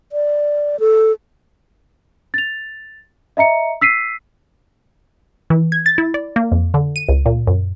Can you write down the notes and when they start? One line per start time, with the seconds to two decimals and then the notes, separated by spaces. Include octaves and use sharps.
0.12 D5
0.80 A4
2.34 A6 F7
3.37 D#5 E5 A#5 C#7
3.81 E6 B6 C7 D#7
5.50 E3
5.72 G#6
5.86 A6
5.98 E4
6.14 D5
6.36 A#3
6.52 F2
6.74 D3
6.96 D#7
7.09 C#2
7.26 A#2
7.47 F#2